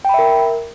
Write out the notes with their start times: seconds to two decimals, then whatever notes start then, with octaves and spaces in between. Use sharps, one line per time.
0.05 G5
0.09 B5
0.14 E5
0.19 A#4